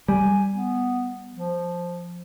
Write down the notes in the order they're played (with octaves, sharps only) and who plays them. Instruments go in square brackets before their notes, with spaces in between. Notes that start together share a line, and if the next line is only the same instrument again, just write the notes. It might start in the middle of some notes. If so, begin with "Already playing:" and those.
[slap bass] G3 [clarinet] G#5
[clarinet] B3
F3